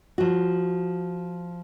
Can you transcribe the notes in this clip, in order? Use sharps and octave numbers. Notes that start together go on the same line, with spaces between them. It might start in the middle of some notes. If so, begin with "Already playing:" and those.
F3 F#4